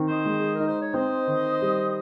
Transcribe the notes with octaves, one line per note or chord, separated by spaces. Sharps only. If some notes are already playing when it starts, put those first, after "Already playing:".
Already playing: D#3 C4
C5 D#5
G#3
G#4
A#4
D#4
C5
C#5
C4 C5 D#5
D#3
G3